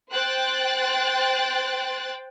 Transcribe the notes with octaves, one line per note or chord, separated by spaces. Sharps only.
C5 G5 F#6 A6